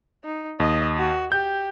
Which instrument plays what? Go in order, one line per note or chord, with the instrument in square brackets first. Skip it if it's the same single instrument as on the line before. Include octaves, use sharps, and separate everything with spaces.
[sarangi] D#4
[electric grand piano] D#2 [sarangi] D#5
[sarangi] F#4
[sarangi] G4 [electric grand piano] G6